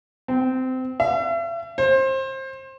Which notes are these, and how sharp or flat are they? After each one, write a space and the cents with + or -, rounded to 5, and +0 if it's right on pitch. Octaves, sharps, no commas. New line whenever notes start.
C4 -20
E5 +40
C5 +25